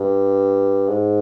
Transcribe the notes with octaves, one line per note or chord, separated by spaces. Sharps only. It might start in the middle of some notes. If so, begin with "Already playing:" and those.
Already playing: G2
G#2